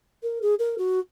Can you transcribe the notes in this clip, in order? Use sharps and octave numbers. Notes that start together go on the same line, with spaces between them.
A#4
G#4
A#4
F#4